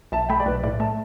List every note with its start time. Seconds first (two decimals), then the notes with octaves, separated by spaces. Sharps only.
0.12 B1 E5 A5
0.29 A3 G5 B5
0.40 D5
0.46 B1 B4
0.63 A2 D5
0.80 A3 E5 A5